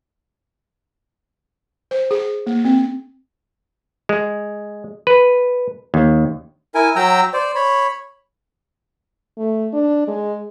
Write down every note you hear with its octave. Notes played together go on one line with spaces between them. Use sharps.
C5
G#4
A#3
C4
G#3
B4
D#2
E4 A#4 G#5
F#3 G5 A#5 E6
C5 D5
C#5 B5
A3
D4
G#3